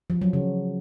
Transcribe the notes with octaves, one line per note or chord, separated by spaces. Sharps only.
F3
F#3
C#3